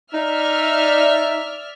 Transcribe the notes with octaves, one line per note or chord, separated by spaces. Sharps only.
D#4 D5 E5 F6